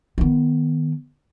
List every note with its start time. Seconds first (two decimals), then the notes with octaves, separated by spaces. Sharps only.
0.18 D#3 B3